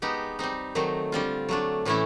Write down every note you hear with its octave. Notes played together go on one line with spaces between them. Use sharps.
G#3 B3 D#4 G4
G3 C4 D#4
D#3 F#3 A3 C4
D3 G3 C4 F4
F#3 A3 D4
A2 E3 A3 C#4 E4